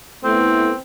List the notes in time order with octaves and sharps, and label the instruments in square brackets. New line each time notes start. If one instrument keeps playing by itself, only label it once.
[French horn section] A3 B3 E4 [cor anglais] C4